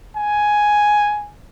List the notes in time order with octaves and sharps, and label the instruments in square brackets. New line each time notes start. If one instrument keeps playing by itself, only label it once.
[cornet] G#5